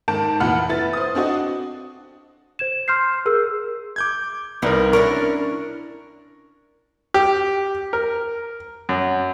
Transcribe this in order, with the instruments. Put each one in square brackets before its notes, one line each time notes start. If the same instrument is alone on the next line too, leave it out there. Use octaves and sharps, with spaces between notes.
[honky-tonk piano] G#2 D#3 A5 G6 D7
F1 A#2 E3 F#5 B5 F6
E4 B4 A6
C5 D#6
C4 D4 F#4 D#5
[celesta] C5 G#6 E7
C6 F6 G6 C7
G#4 A#4 E6
[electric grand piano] D6 G6 G#6
[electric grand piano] C2 A#4 [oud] B3 D#4 D5
[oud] C#4 D4 E4 [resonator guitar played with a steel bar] A#4 [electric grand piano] C#6
[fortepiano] G4
A#4
F#2